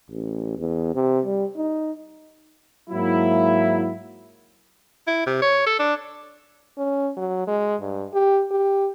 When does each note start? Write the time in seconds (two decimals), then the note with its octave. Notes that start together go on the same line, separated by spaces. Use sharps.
0.10 A1
0.58 E2
0.95 C3
1.25 G3
1.56 D#4
2.90 G#2 F#3 A#3 E4
5.07 E4
5.26 C3
5.42 C#5
5.67 A4
5.79 D4
6.78 C#4
7.17 F#3
7.47 G#3
7.81 G2
8.14 G4
8.51 G4